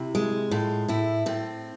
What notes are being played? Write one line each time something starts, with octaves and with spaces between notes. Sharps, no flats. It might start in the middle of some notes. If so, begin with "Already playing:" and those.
Already playing: C3 E4
G#3
A2 F4
A2 E4
A2 C4